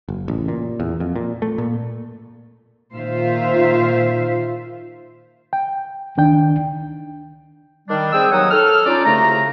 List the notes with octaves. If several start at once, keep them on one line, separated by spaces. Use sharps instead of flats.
F#1
A1
A#2
E2
F2
A#2
A3
A#2
A#2 D#3 F4 C5 E5 F5
G5
C#2 D#3 D4 G5
D#3 G3 D4
C4 G#4 G5 E6
D#2 F#3 D#4 C#5 F#5 D#6
A4 F6
C#4 D#4 F4 D5
C2 C#3 A3 A#5